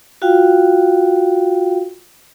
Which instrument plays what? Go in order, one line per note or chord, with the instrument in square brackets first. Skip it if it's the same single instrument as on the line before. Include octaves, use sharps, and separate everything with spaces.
[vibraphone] F4 F#4 F5 G5